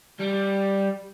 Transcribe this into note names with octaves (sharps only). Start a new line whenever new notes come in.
G3